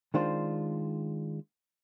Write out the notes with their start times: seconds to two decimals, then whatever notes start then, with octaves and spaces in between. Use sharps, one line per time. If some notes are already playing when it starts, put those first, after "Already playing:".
0.14 D#3 G#3 D4 F4 C5